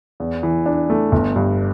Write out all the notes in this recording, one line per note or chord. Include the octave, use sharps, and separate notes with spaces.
E2
E3
D4
A3
G1
G2